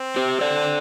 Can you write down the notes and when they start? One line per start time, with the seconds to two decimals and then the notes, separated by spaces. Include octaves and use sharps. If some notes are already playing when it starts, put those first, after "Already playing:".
Already playing: C4
0.16 G4 C5
0.41 A4 D5